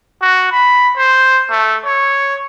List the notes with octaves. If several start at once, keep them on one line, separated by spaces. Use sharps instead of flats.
F#4
B5
C5
A3
C#5